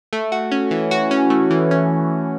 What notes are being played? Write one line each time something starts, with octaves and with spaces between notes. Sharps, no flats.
A3
F#4
C#4
E3
F#4
C#4
A3
E3
C#4